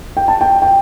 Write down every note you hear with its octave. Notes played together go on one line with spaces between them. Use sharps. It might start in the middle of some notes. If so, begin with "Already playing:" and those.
G5
A5
G5
G5